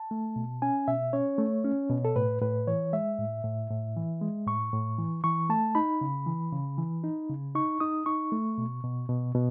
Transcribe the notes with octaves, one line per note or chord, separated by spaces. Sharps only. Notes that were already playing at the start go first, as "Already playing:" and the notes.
Already playing: A5
A3
B2
C#4 G#5
B2 E5
C#4 C#5
A3
C#4
B2
A4
A2 B4
A2 B4
E3 C#5
G#3 E5
A2
A2
A2
E3
G#3
A2 C#6
A2
E3
E3 C#6
A3 A5
D#4 B5
C#3
E3
C#3
E3
D#4
C#3
D#4 C#6
D#4 D#6
D#4 C#6
A3
B2
B2
B2
B2